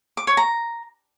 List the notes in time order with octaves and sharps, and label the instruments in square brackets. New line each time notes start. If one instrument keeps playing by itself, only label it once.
[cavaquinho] D6
C#5
A#5